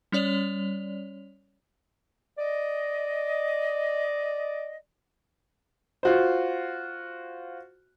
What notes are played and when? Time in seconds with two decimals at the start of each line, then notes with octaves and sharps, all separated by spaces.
0.12 G3 C#4 C#5 D5 F7
2.38 D5 D#5
6.03 F4 F#4 C5